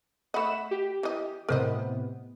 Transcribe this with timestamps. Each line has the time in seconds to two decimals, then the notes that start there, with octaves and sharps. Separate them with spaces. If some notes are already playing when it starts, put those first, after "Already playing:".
0.34 A3 D#5 F#5 B5 E7
0.71 G4
1.03 E3 D#5
1.49 A2 C3 B3 A#4 C5 D#5